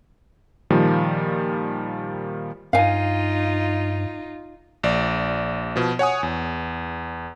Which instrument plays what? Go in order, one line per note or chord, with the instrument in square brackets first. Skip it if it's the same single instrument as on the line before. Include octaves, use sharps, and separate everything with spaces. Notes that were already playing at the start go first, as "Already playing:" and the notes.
[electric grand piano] A#2 D#3 F3 G3
[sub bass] G2 [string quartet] D#4 F4 [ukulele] F5 G#5
[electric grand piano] A#1 D5
B2 F3
C#5 F#5 G#5 D#6
E2